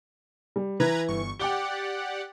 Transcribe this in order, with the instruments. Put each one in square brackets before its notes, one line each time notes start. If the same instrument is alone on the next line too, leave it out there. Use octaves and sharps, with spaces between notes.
[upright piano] G3
[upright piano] E3 [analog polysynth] B4 A#5 G#6
[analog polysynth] G1 C#6
[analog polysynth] G4 D5 F#5 [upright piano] G5 D6 G7